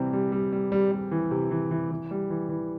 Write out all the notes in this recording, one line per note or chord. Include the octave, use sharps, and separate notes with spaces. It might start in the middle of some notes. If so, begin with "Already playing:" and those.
Already playing: C3 E3 G3 C4
G3
G3
G3
G3
G3
E3
C3
E3
E3
E3
G3
E3
E3